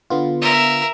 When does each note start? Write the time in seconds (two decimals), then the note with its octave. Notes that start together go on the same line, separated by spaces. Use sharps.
0.10 D3 B3 F4
0.41 A#4 E5